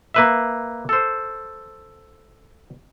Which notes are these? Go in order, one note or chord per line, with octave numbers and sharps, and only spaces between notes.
A#3 B4 E5
A4 C5